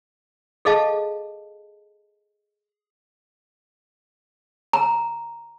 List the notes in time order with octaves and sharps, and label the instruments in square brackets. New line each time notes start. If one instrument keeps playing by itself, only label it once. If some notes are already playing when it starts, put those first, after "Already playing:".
[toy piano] G#4 A4 D#5 F5 A5
A#5